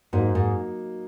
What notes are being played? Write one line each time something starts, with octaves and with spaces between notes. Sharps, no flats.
G#2 F#3 A#3 D#4
G#2